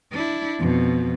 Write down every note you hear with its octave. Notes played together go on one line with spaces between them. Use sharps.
D4 E4
F2 B2